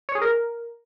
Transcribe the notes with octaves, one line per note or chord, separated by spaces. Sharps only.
C#5
G#4
A#4